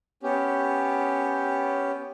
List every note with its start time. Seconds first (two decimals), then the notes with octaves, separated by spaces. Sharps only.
0.23 B3 C#4 G4